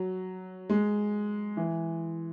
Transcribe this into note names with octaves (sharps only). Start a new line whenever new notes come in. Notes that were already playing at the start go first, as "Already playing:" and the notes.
Already playing: F#3
G#3
E3